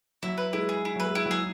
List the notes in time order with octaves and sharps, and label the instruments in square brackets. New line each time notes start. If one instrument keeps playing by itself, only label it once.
[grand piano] F#3 [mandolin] E4
[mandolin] B4
[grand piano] G#3 [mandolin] E4
[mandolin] G#4
E4
[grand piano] F#3 [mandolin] B4
[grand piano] G#3
[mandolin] E4
[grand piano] F#3
[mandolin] G#4